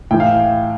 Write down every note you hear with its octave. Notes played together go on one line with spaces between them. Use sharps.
A2 E3 G5
F5